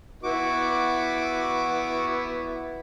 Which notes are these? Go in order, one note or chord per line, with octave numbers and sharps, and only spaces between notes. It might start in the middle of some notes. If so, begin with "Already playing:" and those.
B3 E4 F#4 D6